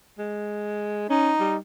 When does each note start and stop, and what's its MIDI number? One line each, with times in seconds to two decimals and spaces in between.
0.19 1.05 56
1.10 1.32 61
1.10 1.56 63
1.40 1.58 55